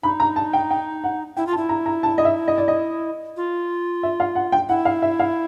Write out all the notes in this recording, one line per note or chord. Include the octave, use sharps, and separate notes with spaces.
D#4 B5
A#5
A5
G5
G5
F#5
E4 G5
F4
A5
E4
A#5
A#5
A5
D#5
E5
D#5
D5
D#5
F4
E5
F5
F#5
G5
E4 F#5
F5
E5
F5